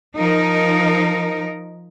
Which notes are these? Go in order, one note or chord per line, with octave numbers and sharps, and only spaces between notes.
F3 D#4 A#4